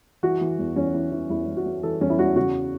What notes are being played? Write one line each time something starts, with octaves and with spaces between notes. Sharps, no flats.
E3 F#4
E3
E2
E2 C#4
E3
E3
E2 E4
E2
F#4
E3
E3 A4
E2 C#4
E4
E2 F#4
C#3 F#4